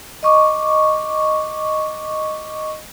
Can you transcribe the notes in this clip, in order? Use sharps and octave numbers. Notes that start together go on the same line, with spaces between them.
D#5 C#6 D6